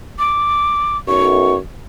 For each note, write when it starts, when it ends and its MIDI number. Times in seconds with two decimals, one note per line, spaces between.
0.19 0.97 86
1.08 1.56 35
1.08 1.56 42
1.08 1.55 85